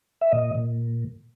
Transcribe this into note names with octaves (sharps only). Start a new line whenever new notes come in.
E5
A#2 D#5
A#2